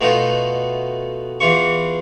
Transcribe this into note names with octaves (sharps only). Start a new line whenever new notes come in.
B2 A3 B3 D#4 F4
E2 E3 F4 C#6